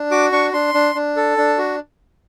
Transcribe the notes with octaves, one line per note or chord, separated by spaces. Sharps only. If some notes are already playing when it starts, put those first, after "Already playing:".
Already playing: D4
F#4 D6
D4 C#6
D4 C6
D4
D4
A4
D4
F#4